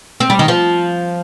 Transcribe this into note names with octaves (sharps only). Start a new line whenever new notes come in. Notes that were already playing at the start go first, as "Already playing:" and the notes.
C4
G3
D#3
F3